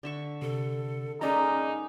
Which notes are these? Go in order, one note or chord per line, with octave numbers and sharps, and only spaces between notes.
D3 E5 C#6
C3 A4
G#3 A#3 C#4 D#4 G#4 D5 A#5